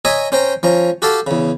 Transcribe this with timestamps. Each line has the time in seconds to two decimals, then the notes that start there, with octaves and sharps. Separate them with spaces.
0.05 C#5 D#5 E5 G#5 A#5 D#6
0.32 C#4 C5 G5 A#5
0.63 F3 C#4 A#5
1.02 F#4 G4 A4 F5 A5
1.27 E2 C#3